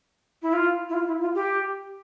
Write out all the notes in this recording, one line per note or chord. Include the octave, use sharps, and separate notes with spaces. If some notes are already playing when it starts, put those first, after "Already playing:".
E4
F4
E4
F4
E4
F4
G4